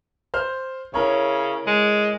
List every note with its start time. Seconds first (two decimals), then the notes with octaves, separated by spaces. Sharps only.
0.34 C5 F6
0.94 C#3 E4 A#4 C#5
1.67 G#3